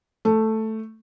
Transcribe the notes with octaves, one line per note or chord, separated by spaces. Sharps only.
A3